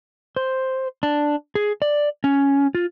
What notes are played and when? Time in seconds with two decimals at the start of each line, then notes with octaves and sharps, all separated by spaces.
0.36 C5
1.03 D4
1.55 G#4
1.82 D5
2.24 C#4
2.75 F4